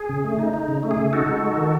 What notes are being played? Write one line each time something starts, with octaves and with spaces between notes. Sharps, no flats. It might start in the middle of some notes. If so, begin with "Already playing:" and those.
Already playing: G#4
C#3
A3
D#4
D#4
C#3
A3
G#4
C#3
D#4 F#4 A4
G#3
D#4
D#3